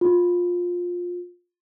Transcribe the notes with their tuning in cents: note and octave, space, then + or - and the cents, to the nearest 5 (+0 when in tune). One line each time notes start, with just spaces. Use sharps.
F4 +15